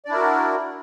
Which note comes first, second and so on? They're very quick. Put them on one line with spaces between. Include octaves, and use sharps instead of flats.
D5 D4 E4 A#4 F#4